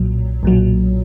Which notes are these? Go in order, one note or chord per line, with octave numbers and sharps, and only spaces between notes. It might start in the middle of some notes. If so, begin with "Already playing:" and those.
Already playing: B1 A#2 F#3
B1 A#2 F#3